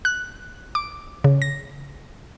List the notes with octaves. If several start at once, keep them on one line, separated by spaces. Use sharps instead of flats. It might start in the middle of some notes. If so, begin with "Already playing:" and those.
F#6
D6
C#3
A#6